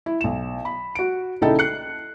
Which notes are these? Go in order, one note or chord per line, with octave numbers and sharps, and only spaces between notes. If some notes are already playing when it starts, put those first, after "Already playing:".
E4
B1 E7
B5
F#4 D7
A#1 C#3 D#4 E4 A4 G5
F#6 C7 C#7